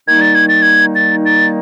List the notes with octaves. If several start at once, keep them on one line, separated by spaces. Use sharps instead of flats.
D#3 G3 A#3 D#4 G#6
A6
G#6
A6
G#6
A6
A6